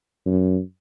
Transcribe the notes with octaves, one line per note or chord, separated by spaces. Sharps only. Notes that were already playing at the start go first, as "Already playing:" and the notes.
F#2